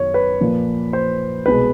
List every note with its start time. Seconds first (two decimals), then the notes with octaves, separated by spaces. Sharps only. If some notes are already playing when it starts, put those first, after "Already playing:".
Already playing: F#2 D#3 F#3 B3 C#5
0.14 B4
0.41 A#2 F3 A#3
0.93 C5
1.46 C2 B2 G#3 B4